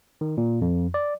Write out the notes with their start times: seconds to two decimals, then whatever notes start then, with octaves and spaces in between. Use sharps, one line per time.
0.21 D#3
0.37 A#2
0.62 F2
0.94 D5